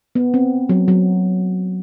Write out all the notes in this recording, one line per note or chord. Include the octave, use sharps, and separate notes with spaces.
B3
C4
F#3
F#3